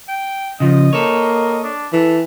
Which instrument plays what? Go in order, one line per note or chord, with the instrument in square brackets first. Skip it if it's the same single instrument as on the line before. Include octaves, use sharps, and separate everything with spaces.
[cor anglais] G5
[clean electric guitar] C#3 F3 [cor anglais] D#5
[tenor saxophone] A#3 [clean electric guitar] A4 C#5
[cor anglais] D4
[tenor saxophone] E3 [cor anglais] A4